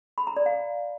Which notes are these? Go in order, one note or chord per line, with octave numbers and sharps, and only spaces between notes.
B5
A#5
D5
F5